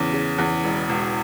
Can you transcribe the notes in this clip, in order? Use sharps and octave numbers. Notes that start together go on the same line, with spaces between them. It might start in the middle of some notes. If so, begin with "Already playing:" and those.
Already playing: E2 C#3
C#3
E2
E1
E1